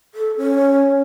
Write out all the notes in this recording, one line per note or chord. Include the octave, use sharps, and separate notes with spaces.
A4
C#4